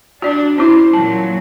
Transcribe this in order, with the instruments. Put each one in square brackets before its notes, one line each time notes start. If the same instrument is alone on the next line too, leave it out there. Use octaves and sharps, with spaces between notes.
[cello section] D4 [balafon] F#4 D5
[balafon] C#4 E4 [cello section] C5
[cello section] A#2 F#3 [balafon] A5